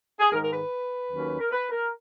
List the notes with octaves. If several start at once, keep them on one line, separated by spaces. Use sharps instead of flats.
G#4
G#2 D#3 G#3 A#4
A#4
B4
D#2 D#3 F#3 C#4
A#4
B4
A#4